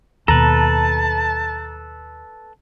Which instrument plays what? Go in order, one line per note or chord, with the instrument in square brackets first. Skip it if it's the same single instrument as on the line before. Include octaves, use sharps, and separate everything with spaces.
[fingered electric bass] D#2 B2 [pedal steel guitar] A4 B4 [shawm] A5 [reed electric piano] A#5